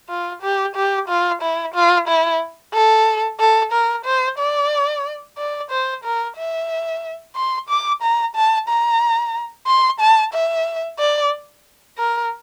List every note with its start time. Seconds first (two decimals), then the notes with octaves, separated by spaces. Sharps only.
0.09 F4
0.42 G4
0.75 G4
1.08 F4
1.42 E4
1.74 F4
2.08 E4
2.74 A4
3.40 A4
3.72 A#4
4.05 C5
4.38 D5
5.38 D5
5.71 C5
6.04 A#4
6.37 E5
7.36 C6
7.69 D6
8.02 A#5
8.35 A5
8.68 A#5
9.67 C6
10.00 A5
10.33 E5
10.99 D5
11.98 A#4